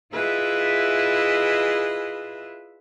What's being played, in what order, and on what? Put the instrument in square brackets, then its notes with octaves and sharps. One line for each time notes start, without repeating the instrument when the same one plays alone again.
[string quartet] E4 F4 G#4 B4 D#5 E5